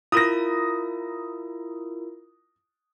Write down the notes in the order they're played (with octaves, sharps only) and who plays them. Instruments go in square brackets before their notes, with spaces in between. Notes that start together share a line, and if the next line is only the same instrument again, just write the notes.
[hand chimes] E4 F4 A#4 [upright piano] D#6 A#6